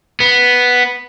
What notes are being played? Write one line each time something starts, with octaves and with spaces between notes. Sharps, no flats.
B3